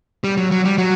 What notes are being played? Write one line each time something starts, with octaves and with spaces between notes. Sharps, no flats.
G3
F#3
F#3
G3
F#3